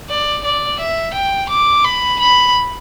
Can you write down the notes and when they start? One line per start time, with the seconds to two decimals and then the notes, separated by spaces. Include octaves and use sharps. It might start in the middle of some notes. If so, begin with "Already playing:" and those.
0.10 D5
0.44 D5
0.80 E5
1.14 G5
1.49 D6
1.84 B5
2.20 B5